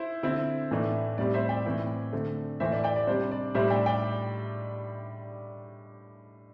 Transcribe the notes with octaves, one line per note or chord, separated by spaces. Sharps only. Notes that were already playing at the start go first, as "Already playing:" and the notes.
Already playing: E4 C5
D3 C4 E4
A2 E3 A3 D4
A2 G3 C4 D5
C5 E5
D5 G5
A2 E3 C4 E4
D3 A3 C4
A2 E3 A3 C5 E5
D5
D5 G5
D5
C3 G3 D4 C5
D5
A2 G3 D4 C5 E5
D5 G5
D5 G5